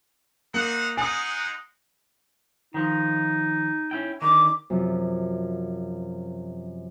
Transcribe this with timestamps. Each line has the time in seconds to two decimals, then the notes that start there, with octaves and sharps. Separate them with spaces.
0.54 A#3 C4 D#4 F#5
0.97 G#3 D#4 F#5 G#5 D#6
2.74 D#3 F3 D#4
3.91 C#4 E4 G5
4.22 D3 D#3 D6
4.70 F#2 C3 F3